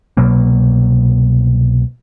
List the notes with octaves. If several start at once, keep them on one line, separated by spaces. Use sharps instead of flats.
C2 B2 F#3 A#3